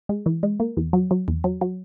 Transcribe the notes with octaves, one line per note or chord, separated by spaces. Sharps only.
G#3
E3
G#3
A#3
E2
F#3
F#3
E2
F#3
F#3